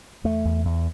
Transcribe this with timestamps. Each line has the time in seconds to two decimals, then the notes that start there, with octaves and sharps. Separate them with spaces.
0.24 E2 A3
0.45 E2
0.65 E2